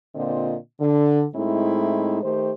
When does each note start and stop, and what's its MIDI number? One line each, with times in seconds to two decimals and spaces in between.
0.15 0.55 46
0.15 0.55 50
0.15 0.55 60
0.15 0.55 65
0.15 0.55 75
0.80 1.24 50
1.34 2.21 45
1.34 2.21 56
1.34 2.21 60
1.34 2.21 63
1.34 2.21 64
2.23 2.50 51
2.23 2.50 57
2.23 2.50 67
2.23 2.50 72